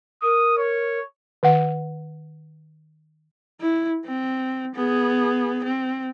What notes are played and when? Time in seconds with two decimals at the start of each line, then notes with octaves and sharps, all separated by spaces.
0.23 A#4 D#6
0.58 C#5
1.43 D#3 F#5
3.61 E4
4.05 C4
4.75 B3 G#4
5.64 C4